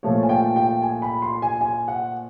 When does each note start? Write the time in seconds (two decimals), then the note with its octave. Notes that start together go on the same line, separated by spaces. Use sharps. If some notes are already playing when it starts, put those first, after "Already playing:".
0.03 A#2 F3 A3 C#5
0.23 G#5
0.29 G5
0.56 G5
0.82 G#5
1.02 B5
1.22 C6
1.42 G#5
1.61 G#5
1.88 F#5